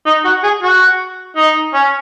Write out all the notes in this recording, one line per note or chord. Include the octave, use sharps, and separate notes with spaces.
D#4
F#4
G#4
F#4
D#4
C#4